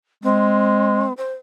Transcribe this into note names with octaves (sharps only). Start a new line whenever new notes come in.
G#3 C4
C5